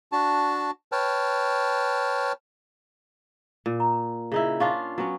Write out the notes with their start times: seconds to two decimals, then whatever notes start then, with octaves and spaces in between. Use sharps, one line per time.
0.12 D4 F#4 A5
0.92 B4 C#5 G5 A5 F6
3.66 A#2
3.80 A#5
4.32 C#3 D#4 E4
4.60 C#4 D4 F4 F5
4.98 F#3 B3 C#4